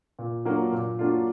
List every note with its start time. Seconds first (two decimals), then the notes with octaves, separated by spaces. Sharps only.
0.19 A#2
0.45 F#3 A#3 D4 F4
0.72 A#2
0.99 F#3 A#3 D4 F4